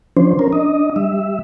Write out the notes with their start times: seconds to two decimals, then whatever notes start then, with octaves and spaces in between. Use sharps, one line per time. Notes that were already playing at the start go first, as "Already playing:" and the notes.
0.17 F3 C#4 D4 C5
0.39 C#4 A#4
0.53 D4 D#5
0.96 G3 E5